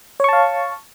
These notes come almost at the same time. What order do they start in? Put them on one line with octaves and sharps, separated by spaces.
C#5 C#6 A5 F5